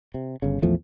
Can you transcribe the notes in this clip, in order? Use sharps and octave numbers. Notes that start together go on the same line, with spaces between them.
C3
G1 C#3
A#1 E2 F3 A3